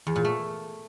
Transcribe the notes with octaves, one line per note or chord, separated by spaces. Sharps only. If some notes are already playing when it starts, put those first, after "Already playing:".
E2
A#2
A3